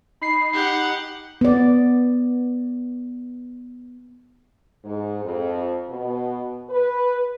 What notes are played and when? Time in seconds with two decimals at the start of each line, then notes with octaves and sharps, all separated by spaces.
0.21 D#4 B5 C7
0.53 G4 F#5
1.41 B3 D5
4.84 G#2
5.24 F2
5.90 B2
6.70 B4